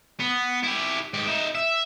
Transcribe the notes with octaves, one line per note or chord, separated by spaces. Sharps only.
B3
E4 G4
G#2 G4
D#4 E5
E5